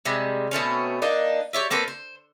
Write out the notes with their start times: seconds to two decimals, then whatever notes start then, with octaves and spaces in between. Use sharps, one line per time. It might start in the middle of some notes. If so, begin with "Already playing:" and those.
0.05 C3 G3 G#3
0.51 B2 A3 C4 C#4
1.02 A#3 D4 D#4
1.53 G4 C#5 D5 E5
1.71 A#3 C4 A4 B4
1.88 C5